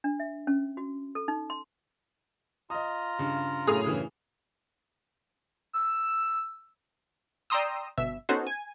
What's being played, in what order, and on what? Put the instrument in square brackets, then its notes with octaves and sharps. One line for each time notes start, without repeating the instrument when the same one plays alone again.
[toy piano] D4
E5
C#4
F#4
A4
D#4
C6
[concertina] F4 A#5 [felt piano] D#5 D#6
[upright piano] G2 C#3
[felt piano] F#2 A2 A3 [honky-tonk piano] G#4 D#6 F7
[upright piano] G2 C#3 E3
[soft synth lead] E6
[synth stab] D5 G5 A#5 C6 D#6 E6
G1 B2 E5
B3 C#4 D#4 F#4 A4 C5
G#5